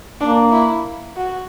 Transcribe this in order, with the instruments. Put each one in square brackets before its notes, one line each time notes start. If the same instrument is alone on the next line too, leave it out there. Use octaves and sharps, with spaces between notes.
[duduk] A#3 [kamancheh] D4
[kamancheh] E4
F#4